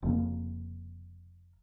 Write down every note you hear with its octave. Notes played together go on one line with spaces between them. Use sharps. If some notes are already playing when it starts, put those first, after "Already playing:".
F1 F2 C#3 A#3